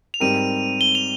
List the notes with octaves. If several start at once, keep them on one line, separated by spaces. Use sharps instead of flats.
F7
G#2 G3 C4 G4 A#4 D#7
G7
F7